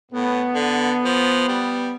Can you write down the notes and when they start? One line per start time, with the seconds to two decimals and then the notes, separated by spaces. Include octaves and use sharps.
0.12 A2 B3
0.55 D3
1.05 F3
1.48 G3